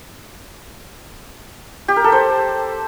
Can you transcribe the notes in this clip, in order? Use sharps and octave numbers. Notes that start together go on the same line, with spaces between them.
G4
A#4
A4
C5